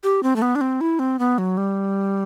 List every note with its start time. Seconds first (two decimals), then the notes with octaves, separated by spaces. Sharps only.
0.04 G4
0.23 C4
0.36 A3
0.42 B3
0.55 D4
0.61 C4
0.81 E4
0.99 C4
1.19 B3
1.38 F#3
1.57 G3